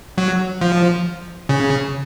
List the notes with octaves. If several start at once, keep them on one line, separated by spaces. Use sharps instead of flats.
F#3
F3
C#3